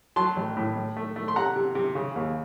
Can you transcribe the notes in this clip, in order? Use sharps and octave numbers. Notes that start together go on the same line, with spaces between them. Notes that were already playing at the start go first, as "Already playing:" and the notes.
F#3 A5 C6
A1
A2
A2
A3
A3
C6
C3 F#5 A#5
C3
C3
C#3
D#2